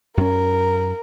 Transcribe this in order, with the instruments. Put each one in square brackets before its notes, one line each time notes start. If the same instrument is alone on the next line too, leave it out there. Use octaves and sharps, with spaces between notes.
[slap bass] F#2 C#4 [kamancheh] A#4